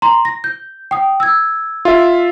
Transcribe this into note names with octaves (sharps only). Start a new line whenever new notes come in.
A#5 C6
A#6
G6
G5 D#6
E6 G#6
F4 E5